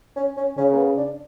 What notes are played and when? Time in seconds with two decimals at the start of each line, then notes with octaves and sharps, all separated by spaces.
0.16 C#4
0.37 C#4
0.57 C#3 C#4
0.72 A#3
0.77 B3
0.98 D4